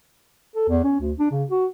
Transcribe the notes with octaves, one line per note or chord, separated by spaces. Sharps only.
A4
E2
C#4
D2
D4
C#3
F#4